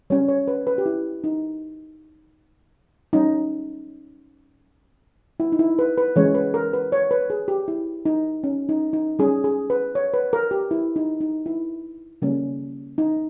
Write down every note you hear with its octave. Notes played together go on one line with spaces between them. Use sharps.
G3 C#4 C#5
C#5
B4
B4
G4
E4
D#4
G3 C#4 D#4
E4
D#4
E4
B4
B4
E3 G#3 C#4 C#5
B4
A#4
B4
C#5
B4
G#4
G4
E4
D#4
C#4
D#4
D#4
G3 C#4 G#4
G#4
B4
C#5
B4
A#4
G4
E4
D#4
D#4
E4
C#3 G3 A#3 C#4
D#4